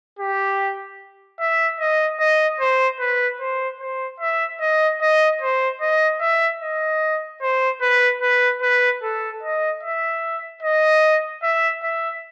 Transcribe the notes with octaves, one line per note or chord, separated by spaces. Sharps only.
G4
E5
D#5
D#5
C5
B4
C5
C5
E5
D#5
D#5
C5
D#5
E5
D#5
C5
B4
B4
B4
A4
D#5
E5
D#5
E5
E5